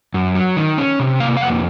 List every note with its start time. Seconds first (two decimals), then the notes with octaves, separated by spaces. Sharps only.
0.14 F#2
0.35 F#3
0.57 D#3
0.78 C#4
1.00 C3
1.20 A#3 F5
1.37 F5
1.41 F2 F#5